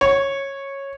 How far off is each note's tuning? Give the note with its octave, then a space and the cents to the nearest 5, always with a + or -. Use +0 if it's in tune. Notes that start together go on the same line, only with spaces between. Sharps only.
C#5 -10